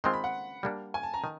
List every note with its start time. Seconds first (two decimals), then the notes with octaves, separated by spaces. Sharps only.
0.04 D#3 G#3 C4 F4 C6
0.13 B5
0.24 F#5
0.63 G3 A#3 D4
0.94 G#5
1.03 A5
1.14 A#5
1.24 D#3